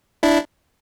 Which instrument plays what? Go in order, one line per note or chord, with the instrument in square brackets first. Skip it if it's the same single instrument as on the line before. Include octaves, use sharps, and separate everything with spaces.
[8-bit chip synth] D4 E4